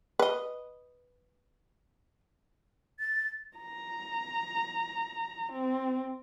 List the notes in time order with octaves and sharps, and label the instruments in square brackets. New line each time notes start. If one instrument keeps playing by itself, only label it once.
[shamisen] B4 D#5
[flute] A6
[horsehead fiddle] A#5
C4